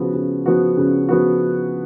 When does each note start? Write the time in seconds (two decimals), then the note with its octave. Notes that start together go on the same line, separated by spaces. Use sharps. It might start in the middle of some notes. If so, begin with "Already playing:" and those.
Already playing: C#3 F3 B3 F#4
0.14 C#3
0.46 F3 B3 F#4
0.77 C#3
1.09 F3 B3 F#4